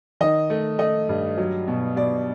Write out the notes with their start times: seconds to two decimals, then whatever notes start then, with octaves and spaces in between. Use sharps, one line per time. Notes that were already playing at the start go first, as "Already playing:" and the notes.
0.21 D#3 D#5
0.50 A3
0.79 A3 D#5
1.09 G2
1.38 F#3
1.68 B2
1.97 B2 D5